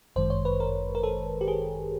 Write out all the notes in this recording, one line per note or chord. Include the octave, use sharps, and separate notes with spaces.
G1 F#2 D#3 G#3 C5
C#5
B4
A#4
A#4
A4
G4
G#4